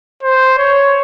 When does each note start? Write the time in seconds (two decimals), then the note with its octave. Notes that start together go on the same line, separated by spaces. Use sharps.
0.23 C5
0.58 C#5